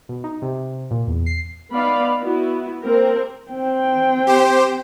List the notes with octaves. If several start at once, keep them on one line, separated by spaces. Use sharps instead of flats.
B2
D#4
C3
A#2
E2
C7
B3 D#4 D5 F5 B5
B3 E4 F#4
A#3 C4 A#4
C4 G5
G4 C5